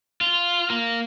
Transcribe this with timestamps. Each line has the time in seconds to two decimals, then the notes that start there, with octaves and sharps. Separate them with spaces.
0.21 F4
0.70 A#3